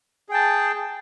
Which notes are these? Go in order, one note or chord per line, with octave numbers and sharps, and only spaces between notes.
G#4 G5 A5